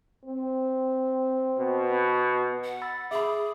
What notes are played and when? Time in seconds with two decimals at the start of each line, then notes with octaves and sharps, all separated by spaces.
0.25 C4
1.58 B2
2.64 F#5
2.82 B5 E6 A6
3.11 G#4 E5 B5 D6